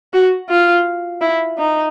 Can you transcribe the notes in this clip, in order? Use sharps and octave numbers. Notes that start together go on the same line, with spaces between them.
F#4
F4
E4
D#4